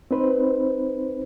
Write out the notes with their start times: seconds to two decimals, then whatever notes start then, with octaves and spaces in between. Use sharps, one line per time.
0.11 C4 D#4 B4 C5